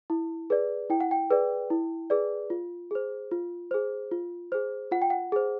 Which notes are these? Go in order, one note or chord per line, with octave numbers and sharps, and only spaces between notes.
E4
G#4 B4 D5
E4 G5
F#5
G5
G#4 B4 D5
E4
G#4 B4 D5
F4
G#4 C5
F4
G#4 C5
F4
G#4 C5
F4 F#5
G5
F#5
G#4 C5